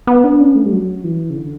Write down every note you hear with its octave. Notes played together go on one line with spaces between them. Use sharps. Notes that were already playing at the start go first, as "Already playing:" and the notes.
B3
D4
C#4
A3
G3
F#3
E3
C#3
D3